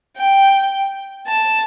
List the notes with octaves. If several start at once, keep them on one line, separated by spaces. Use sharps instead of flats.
G5
A5